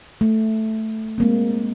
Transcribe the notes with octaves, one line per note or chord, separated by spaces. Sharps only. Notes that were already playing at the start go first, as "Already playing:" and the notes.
A3
G#3 A#3 C4